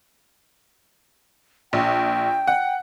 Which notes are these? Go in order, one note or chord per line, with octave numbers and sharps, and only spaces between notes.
A#1 G5
F#5